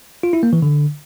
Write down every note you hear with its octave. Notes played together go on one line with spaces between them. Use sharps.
F4
E4
A#3
E3
D3